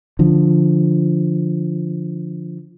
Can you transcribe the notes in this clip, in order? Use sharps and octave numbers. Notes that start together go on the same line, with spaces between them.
D3 F3